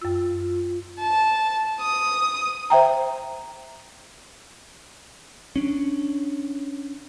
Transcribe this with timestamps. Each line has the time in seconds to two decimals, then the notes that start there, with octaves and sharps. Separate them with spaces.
0.02 F#2 F4 E6
0.98 A5
1.81 D#6
2.70 C5 E5 G5 A#5
5.56 C#4 D4